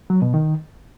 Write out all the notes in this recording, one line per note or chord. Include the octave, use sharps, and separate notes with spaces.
F#3
B2
D#3